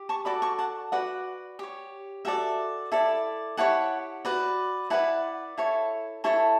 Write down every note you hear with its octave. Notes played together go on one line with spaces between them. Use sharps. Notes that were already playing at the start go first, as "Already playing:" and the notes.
Already playing: G4
A5 C#6
F#4 A4 D5 B5 D6
A5 C#6
F#5 A5
F#4 B4 D5 F#5
G4 C#5
F#4 A4 D5 E5 G5
E4 A4 D5
E4 G4 C#5 F#5 A5
F#4 B4 D5
E4 B4 D5 F#5 A5
E4 A4 C#5
E4 A4 C#5 A5 C#6